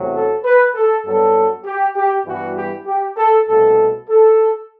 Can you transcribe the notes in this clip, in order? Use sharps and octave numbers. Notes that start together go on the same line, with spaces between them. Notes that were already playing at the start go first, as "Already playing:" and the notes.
Already playing: E2 C3 F#3 A3
A4
B4
A4
G2 F#3 B3 A4
G4
G4
G2 E3 G3 B3 F#4
G4
G4
A4
C2 B2 A3 A4
A4